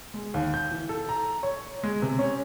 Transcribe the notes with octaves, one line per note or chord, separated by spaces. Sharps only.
G#3
D#2
G6
E3
A4
A#5
C#5
G#3
C3
C#4